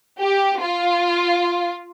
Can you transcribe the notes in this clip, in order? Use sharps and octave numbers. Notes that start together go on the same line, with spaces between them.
G4
F4